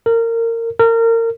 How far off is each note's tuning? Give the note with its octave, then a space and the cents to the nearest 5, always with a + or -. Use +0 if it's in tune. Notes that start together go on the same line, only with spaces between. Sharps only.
A#4 -25
A#4 -30